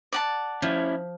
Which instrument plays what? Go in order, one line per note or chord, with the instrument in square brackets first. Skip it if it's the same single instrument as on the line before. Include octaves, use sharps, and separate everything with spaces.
[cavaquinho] D5 F#5 A5
[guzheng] F3 [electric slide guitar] C#4 E4